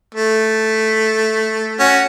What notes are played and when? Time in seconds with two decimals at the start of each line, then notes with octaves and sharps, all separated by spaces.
0.15 A3
1.80 C#4 F#4